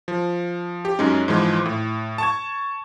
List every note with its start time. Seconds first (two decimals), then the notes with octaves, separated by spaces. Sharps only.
0.08 F3
0.85 G4
0.99 F#2 G#3 C#4 D#4
1.28 G#2 E3 F3 G#3
1.66 A2
2.18 A5 C#6 G#6